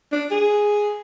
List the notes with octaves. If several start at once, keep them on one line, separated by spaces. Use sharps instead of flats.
D4
G#4